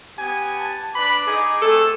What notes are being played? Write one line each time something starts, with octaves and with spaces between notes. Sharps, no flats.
B3 G4 G#5
A5
D4 B4 B5 D6
D#4 G#4
A3 C4 G#4 A4